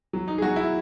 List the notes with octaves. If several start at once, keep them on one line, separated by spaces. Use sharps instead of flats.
F#3
D#4
G#4
F#3 F#4
E4